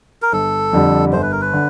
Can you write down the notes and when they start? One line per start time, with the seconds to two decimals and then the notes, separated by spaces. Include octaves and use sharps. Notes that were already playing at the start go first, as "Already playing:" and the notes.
0.22 A#4
0.32 G1 A4
0.73 F2 D3 G3
1.12 G1 C5
1.22 B4
1.32 A#4
1.41 B4
1.54 D3